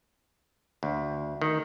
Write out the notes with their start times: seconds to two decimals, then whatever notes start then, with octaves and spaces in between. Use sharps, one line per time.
0.83 D2
1.42 D#3